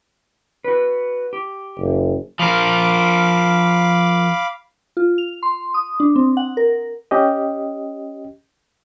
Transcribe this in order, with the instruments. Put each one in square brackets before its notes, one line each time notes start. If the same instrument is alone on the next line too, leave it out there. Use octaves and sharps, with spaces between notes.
[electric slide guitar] F#4 B4
G4
[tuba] F#1
[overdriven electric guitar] F3 A#4 [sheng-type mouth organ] F5 B5 D6
[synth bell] F4
F7
C6
D#6
D4
C4
F#5
A#4
[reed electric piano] C#4 G4 D#5